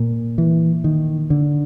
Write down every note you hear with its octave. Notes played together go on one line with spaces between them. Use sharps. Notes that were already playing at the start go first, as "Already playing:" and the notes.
Already playing: A#2
E3
D#3
D3